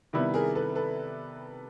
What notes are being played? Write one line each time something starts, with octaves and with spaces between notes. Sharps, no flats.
C3 D#3 G3 B3 E4
G#4 A#4
A4 B4
A4 B4